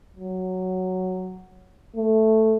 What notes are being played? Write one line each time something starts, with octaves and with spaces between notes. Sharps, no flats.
F#3
A3